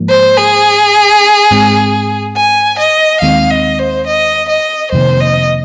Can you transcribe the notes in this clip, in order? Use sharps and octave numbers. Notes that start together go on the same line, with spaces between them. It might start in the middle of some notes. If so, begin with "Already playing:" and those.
Already playing: G#2 F3 A#3
C5
G#4
G#2 G#3 C4
G#5
D#5
D#2 D#3 G#3 C4 F5
D#5
C5
D#5
D#5
F2 C3 D#3 A#3 C5
D#5